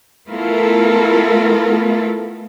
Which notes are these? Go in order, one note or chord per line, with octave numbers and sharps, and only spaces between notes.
A3 B3 E4 F4 A4 A#4